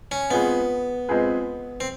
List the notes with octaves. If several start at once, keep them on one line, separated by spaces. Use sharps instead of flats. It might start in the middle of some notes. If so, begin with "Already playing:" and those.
C#4
G#3 B3 C4 F4 G#4 B4
G#3 C4 F4 G#4 B4
C4